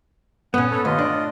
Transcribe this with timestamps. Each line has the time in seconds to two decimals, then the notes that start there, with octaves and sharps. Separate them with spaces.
0.54 G2 A#2 B3 C#4 F#5
0.71 A4 B4 C#5
0.85 D#2 A3 F4 C#5 D#5 A5
0.98 D4